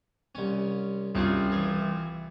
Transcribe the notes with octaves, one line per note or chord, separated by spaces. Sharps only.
C2 C#4
C2 C4 C#4 F4 G#4
E3 G#4